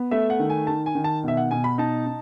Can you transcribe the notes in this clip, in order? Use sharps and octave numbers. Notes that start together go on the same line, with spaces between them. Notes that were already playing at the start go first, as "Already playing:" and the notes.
Already playing: B3
A3 E5
F#5
D#3
G#5
D#3 A5
G#5
D#3
A5
B2 E5
F#5
B2 G#5
B5
D#4 A5
D#4